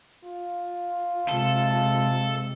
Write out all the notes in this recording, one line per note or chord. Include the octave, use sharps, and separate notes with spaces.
F4
C3 G#3 A4